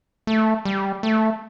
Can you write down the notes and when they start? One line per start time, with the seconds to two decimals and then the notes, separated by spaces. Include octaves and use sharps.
0.27 A3
0.65 G3
1.03 A3